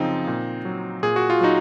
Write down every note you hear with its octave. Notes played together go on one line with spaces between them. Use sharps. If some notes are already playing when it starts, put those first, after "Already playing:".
Already playing: F#2 C#3 F3 C4 D#4
A#2
F#3
A#2 G#4
F#4
F4
F#3 D#4 F#4